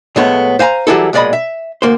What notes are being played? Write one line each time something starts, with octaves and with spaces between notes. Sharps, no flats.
A2 F3 G#3 A3 B3 C#5
C5 F5 G#5 A#5
E3 F#3 G3 E4 G#4 A4
B1 A#2 G#3 D5 D#5 B5
E5
D2 A#3 C5